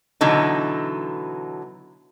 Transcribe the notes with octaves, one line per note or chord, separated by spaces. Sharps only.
B2 D3 E3 F#3 D#4